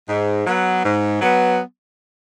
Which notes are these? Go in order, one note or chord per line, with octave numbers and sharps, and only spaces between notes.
G#2
F#3 B3
G#2
F#3 B3